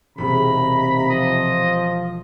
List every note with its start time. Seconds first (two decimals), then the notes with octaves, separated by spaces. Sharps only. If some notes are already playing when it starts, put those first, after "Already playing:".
0.18 E1 D#2 C3 A#5 B5
1.10 F3 D#5